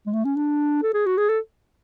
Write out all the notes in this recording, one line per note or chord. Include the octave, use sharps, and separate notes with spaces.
G#3
A3
C#4
D4
A4
G#4
F#4
G#4
A4